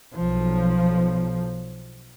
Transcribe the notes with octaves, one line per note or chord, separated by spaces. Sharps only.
B1 F3